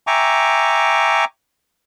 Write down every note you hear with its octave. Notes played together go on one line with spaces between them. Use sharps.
E5 G5 G#5 A#5 C#6 D6